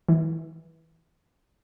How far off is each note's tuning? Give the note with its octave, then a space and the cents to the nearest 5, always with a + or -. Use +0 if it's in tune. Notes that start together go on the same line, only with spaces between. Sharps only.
E3 -15